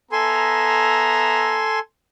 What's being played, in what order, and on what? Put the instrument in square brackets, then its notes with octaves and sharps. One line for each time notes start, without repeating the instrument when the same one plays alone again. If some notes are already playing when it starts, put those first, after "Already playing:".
[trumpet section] B3 E5 A#5 [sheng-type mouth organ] A4 G#5 C6